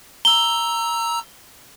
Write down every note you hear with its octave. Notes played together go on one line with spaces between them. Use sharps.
A#5 E6 G7